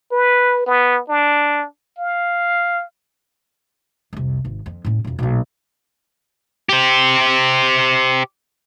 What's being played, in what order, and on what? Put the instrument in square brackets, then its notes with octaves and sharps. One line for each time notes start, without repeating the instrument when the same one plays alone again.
[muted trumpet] B4
B3
D4
F5
[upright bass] C2 F2
G#1
F2
A2 C#4
E1 F2
B1 A#2
[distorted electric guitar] G4 C5